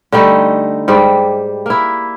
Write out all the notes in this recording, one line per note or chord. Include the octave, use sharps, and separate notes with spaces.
D3 G3 A3 D#4
G#2 G3 G4
A#3 E4